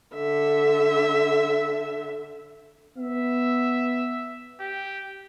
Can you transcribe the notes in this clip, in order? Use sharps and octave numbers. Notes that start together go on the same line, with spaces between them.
D3 E5
B3 E5
G4